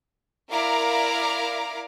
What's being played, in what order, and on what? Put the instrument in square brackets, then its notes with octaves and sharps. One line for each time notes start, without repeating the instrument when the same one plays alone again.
[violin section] E4 A#4 D5 F5 A#5 D6